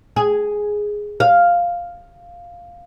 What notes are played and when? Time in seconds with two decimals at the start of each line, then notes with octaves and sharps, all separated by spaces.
0.16 G#4
1.20 F5